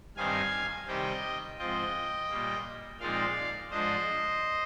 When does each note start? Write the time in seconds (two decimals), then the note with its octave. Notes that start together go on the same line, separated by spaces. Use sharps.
0.17 G2 D#3 G3 C4 D#4 F5 G#5
0.87 C3 D#3 G3 C4 D#5 G5
1.58 G#2 F3 C4 F4 D#5 G5
2.30 A#2 G3 A#3
2.99 A#2 F3 G#3 C4 D#4 D5 F5
3.70 G#2 F3 G#3 D4 C5 D#5